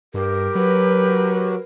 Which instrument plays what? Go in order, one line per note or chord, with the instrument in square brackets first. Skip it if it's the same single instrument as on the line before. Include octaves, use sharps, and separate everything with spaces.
[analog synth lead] G2 [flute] G4 [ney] A#4
[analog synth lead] F#3 [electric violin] B4